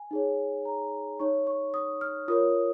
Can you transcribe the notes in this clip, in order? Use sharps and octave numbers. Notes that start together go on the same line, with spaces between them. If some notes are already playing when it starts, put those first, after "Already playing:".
Already playing: G#5
D#4 G#4 C#5
A#5
D#4 C#5 C#6
C#6
D#6
F6
F4 A#4 C#5 D#6